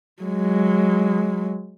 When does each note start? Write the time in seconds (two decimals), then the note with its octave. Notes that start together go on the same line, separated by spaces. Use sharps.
0.23 F#3 G#3